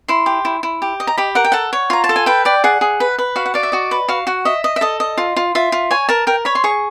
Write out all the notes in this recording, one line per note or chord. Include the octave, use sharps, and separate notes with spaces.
E4 C6
G4
E4
E4
G4
D#5
A#5
G4 B5
A#4 F#5
G5
A4 F#5
C#5
F4 A#5
A5
A4
G#5
B4 G5
D5 G5
G#4 F#5
G#4
B4
B4
F#4 F5
F#5
D5 F5
E5
F#4 D#5
B4
F#4 F5
F#4 F#5
D#5 E5
D#5
E5
A4 D#5
D#5
F4
F4
F4 E5
F4
C#5 G#5
A#4 A5
A#4 G5
C#5 B5
C6
G#4 C#6